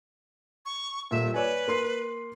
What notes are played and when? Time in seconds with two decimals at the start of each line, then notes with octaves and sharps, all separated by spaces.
0.66 C#6
1.11 D#1 A#2 E5
1.34 B4 C#5 D5 G#5
1.68 A#3 C6 C7